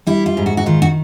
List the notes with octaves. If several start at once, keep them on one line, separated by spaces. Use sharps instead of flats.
G3 E4
F4
G#2
F#4
F#4
D#3 F4
F#4